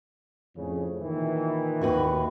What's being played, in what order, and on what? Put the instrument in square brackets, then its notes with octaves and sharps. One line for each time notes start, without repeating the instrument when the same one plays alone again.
[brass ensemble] F2 A2 C#3
A#2 D#3 E3
[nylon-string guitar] D#2 F#4 B4